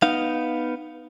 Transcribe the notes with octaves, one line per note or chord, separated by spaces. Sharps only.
B3 D#4 F5